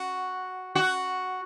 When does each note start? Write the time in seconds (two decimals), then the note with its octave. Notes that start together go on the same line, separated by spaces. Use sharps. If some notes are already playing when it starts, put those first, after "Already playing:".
Already playing: F#4
0.75 F#4